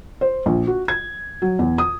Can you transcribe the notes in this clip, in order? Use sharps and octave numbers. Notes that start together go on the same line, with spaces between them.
C5
A#1
F#4
G#6
F#3
E2
D#6